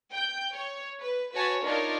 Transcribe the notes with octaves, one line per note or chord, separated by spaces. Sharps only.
G5 G6
C#5
B4
F#4 B4 C#5 G#5 A5
D4 D#4 F4 A#4 C#5